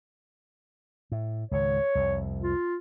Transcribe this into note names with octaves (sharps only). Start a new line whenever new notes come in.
A2
C#2 G#2 D#3 C#5
C2 F2
F4